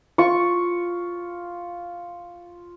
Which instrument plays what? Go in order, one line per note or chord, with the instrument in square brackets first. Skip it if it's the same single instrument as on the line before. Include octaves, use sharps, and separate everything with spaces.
[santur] F4 C#6